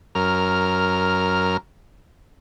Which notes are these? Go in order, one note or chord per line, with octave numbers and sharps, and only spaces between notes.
F#2 A#4 F6